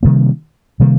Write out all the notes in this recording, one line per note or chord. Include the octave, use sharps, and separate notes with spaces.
C3 D#3 G3 A#3
C3 D#3 G3 A#3